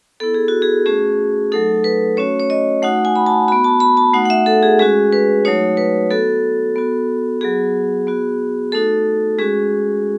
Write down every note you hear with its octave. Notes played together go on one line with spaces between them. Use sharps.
B3 E4 A4
G#4
F#4
G#4
A3 C#4 F#4 G#4
F#3 A3 D#4 A4
B4
A3 C#4 F#4 C#5
C#5
D#5
A3 D#4 F#4 F#5
G#5
B5
A5
B3 F#4 B5
A5
B5
A5
A3 D#4 F#4 F#5
F#5
E5
A4
G#4
G#3 C#4 F#4 G#4
B4
F#3 A3 D#4 F#4 C#5
B4
B3 F#4 A4
B3 F#4
F#3 B3 F#4 G#4
B3 F#4
A3 D#4 F#4 A4
G#3 C#4 F#4 G#4